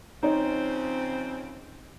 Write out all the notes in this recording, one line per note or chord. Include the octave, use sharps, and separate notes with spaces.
C#3 F3 C4 D#4 C#5